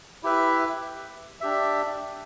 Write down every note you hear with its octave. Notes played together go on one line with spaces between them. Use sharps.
E4 G4 B4 E5
D4 G4 E5